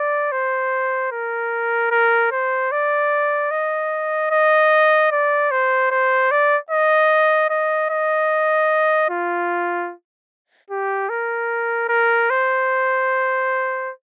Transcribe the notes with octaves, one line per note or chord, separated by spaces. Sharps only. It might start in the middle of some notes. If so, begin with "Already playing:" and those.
Already playing: D5
C5
A#4
A#4
C5
D5
D#5
D#5
D5
C5
C5
D5
D#5
D#5
D#5
F4
G4
A#4
A#4
C5